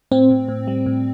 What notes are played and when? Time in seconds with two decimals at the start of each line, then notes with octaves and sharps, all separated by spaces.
0.11 A2 C4
0.30 A2
0.49 A2
0.67 G3
0.86 A2